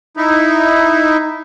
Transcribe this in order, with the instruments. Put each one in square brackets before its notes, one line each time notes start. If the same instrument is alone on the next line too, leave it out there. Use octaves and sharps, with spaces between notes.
[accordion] D#4 E4